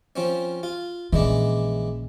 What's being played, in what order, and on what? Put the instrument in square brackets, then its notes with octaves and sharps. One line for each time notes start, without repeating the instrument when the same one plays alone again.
[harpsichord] F3 C4 C#4
F4
[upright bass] A#1 C#3 [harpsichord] E3 G#3 D4